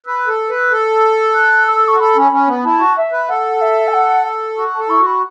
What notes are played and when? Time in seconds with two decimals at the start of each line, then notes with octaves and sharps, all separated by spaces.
0.06 B4 E6
0.27 A4
0.50 B4
0.71 A4
1.34 F#6
1.67 E6
1.88 F#4 C#6
2.00 A4 B5
2.16 C#4
2.32 C#4
2.47 B3
2.64 E4 A5
2.79 F#4
2.97 E5
3.12 B4
3.28 A4 F#5
3.61 E5
3.88 A5
3.93 F#5
4.57 F#4
4.74 A4 A5
4.89 E4 C#6
5.00 F#4
5.06 B5